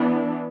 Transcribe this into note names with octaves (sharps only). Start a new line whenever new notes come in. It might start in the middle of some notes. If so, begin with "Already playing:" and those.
Already playing: E3 B3 D4